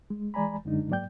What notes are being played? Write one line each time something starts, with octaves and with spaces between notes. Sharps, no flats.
G#3
E3 G#3 D5 G#5 A#5 B5
F#2 D3 G#3 D4 D#4
G#2 F#3 A#3 D5 G5 G6